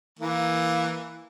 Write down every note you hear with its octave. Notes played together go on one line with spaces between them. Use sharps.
E3 A#3